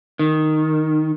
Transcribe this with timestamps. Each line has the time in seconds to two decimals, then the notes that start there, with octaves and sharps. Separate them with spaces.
0.19 D#3